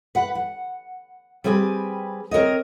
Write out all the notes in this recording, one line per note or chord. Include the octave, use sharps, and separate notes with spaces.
B4 F#5
F#5
G3 C4 G#4 B4 G#5
C4 A#4 C#5 D#5